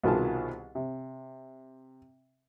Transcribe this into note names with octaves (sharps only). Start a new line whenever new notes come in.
C2 B2 D#3 F4 G#4 A5
C3